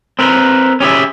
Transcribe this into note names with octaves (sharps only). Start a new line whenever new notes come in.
C4 A#4 B4
C#4 G4 G#4 E5